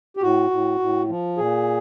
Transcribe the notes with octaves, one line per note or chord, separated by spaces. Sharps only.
G4
A2 F#4
A2
A2
F3
A#2 G#4